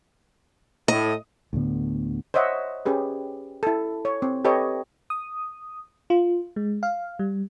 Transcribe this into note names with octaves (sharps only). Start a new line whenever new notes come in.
A2 D#5
D2 A2 D3 B3
C5 C#5 D#5 E5 F#5
C#4 G4 G#4 B4
E4 A4
C#5
C4
G4 A4 B4 C#5 D#5
D#6
F4
G#3
F5
G3